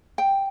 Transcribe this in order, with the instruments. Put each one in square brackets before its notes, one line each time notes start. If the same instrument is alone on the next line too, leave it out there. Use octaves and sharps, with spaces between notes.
[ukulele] G5